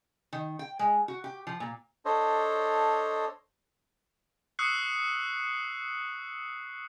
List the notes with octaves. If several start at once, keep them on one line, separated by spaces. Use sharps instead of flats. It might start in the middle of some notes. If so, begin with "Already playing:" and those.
D#3
G5
G#3
F#4
G4
F3
A#2
D4 A4 C5 C#5 D#5
C#6 D#6 E6 F#6 C7 C#7